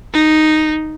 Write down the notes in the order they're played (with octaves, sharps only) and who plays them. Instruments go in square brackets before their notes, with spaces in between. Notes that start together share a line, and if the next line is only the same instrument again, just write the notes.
[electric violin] D#4